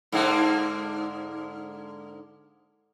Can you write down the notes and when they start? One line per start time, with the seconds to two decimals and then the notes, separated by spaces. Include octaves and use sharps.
0.12 G#2 D3 A#3